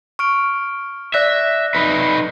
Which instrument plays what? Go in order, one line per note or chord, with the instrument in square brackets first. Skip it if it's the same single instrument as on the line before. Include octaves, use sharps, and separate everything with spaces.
[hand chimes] C#6 F6 D7
[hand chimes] D5 F#6 A#6 [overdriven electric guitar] E5
[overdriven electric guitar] D#4 B4